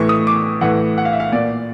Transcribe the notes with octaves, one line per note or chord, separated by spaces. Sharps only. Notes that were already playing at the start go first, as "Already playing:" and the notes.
Already playing: A2 E3 C#6
D#6
D6
A2 E3 F#5
F#5
F5
E5
F5
A#2 D5